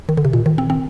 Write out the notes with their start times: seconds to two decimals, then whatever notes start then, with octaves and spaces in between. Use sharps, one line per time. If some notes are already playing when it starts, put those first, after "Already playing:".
0.09 D#3
0.17 D3
0.25 C3
0.33 A#2
0.46 D#3
0.58 C4
0.70 C4